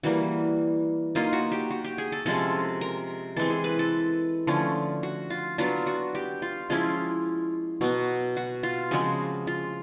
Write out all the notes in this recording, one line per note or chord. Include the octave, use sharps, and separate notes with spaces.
E3 G3 A#3 F#4
F#3 A#3 D#4 F4
F#4
G4
F#4
G4
G#4
A4
C3 F3 G#3 C#4 A4
A#4
E3 G#3 C4 A4
G#4
B4
A4
D3 F3 A3 C#4
F#4
F4
F#3 B3 D4 F4
F#4
G4
F4
F3 G#3 C#4 E4 F4
B2 F#3 B3 F#4
F#4
F4
C#3 F3 G#3 C4 F#4
F4